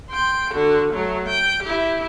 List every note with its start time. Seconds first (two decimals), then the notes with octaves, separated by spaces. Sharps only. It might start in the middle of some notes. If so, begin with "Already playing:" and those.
0.10 G5 C6
0.53 D3 F#4
0.93 F#3 A3
1.27 G5
1.63 E4 G4